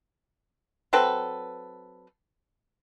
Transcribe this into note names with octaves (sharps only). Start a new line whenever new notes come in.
F#3 C4 A4 B4